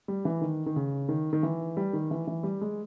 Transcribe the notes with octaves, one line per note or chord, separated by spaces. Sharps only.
G3
E3
D#3
D#3
C#3
D#3
D#3
E3
G3
D#3
E3
E3
G3
G#3